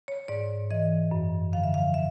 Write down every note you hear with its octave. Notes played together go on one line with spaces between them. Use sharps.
C#5
G#2 D5
E3 D#5
F#2
D3 F3 F5
E5
F5
E5